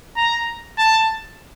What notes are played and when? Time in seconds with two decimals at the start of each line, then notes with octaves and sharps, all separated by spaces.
0.17 A#5
0.78 A5